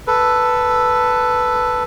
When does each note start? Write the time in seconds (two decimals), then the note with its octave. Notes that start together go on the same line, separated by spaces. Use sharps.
0.07 A4 B4